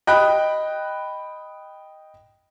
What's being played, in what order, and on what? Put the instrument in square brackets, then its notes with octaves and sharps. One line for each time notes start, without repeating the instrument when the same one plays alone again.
[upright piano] D#5 G5 B5 F#6